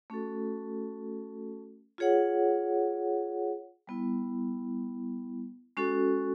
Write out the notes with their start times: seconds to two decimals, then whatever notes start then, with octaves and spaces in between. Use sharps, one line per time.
0.10 A3 C#4 F#4 A4
1.98 F4 G#4 C#5 F#5
3.87 G3 B3 E4
5.77 G#3 C#4 F#4 A4